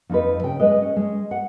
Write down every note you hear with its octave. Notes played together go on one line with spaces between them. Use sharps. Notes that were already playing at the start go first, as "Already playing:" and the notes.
F2 D#4 B4
C#3 G5
G#3 B4 D#5
C#4
G#3
F#5